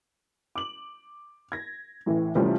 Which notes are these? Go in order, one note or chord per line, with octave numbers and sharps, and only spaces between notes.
D6 F#7
G#6 A#6
A1 A2 E3
C3 E3 F3 G3 A3 C#4